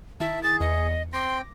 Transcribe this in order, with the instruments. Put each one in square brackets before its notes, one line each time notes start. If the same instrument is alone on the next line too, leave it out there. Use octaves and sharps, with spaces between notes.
[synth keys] D#3 E4 [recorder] E5 [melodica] A5
[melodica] G#4 [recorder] A6
[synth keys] E2 C#7 [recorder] D#5
[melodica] C4 G5 [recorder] C6 [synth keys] D6 A#6